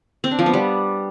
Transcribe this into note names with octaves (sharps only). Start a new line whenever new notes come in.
C4
D4
F3
B3
G3